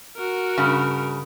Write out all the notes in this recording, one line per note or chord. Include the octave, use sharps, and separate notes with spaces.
F#4 A#4
G2 C#3